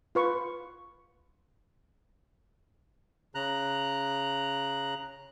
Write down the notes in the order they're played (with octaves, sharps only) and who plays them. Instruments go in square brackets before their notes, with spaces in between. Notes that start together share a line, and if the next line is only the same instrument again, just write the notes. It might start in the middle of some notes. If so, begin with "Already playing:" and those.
[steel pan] F4 B4 C#6
[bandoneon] C#3 A#5 F#6